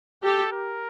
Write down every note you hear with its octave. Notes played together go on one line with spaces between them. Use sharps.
G4 A4
A#4